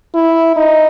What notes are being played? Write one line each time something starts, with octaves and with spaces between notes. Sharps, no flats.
E4
D#4